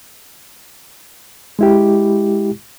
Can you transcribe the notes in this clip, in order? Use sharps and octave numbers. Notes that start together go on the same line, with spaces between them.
G#3 E4 G4